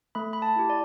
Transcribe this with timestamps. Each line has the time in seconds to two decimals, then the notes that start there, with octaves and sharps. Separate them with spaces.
0.15 A3 B5
0.33 B5
0.42 A5
0.56 E4 G4
0.70 D5